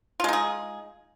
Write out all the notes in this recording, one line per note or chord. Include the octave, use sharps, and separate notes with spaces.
G#3 D#4 F4 G#4